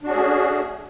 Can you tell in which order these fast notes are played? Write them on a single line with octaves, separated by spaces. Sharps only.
D4 F#4 C#4 G#4 A3